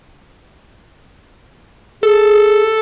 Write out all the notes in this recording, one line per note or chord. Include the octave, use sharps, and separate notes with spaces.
G#4 A4